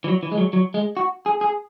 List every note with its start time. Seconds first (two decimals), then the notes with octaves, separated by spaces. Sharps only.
0.04 E3
0.08 F#3
0.23 E3
0.32 G#3
0.38 F#3
0.53 F#3
0.74 G#3
0.97 F#4
1.26 G#4
1.41 G#4